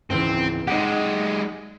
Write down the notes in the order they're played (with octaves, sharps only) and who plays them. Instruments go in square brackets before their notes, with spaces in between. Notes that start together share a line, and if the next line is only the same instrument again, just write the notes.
[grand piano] G#1 C#2 E3 [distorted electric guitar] C4
[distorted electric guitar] G#3 G4 [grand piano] D#4 F#5